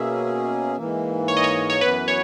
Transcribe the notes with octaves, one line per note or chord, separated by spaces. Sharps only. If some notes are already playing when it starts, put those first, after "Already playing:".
Already playing: B2 A#3 C#4 G#4 E5
G#2 E3 A#3
C#5
D#5
C#5
C#5
F#2 E3 B3 B4
C#5